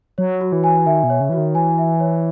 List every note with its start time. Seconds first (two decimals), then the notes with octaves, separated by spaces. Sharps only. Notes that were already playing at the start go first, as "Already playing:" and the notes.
0.18 F#3 C#5
0.41 F#4
0.52 E3
0.64 G#5
0.86 D#3 E5
1.04 B2
1.10 C#5
1.20 C#3
1.30 E3 F#4
1.38 D#3
1.55 E3 G#5
1.78 E5
2.00 C#5